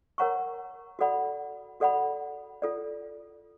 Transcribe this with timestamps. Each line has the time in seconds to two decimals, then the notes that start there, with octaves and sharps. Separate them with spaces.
0.18 A#4 C#5 F#5 A#5 C#6
0.99 F#4 A4 D5 F#5 B5
1.80 F#4 A4 D5 F#5 B5
2.62 F4 A4 D5